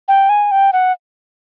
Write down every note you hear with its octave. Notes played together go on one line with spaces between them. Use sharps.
G5
G#5
G5
F#5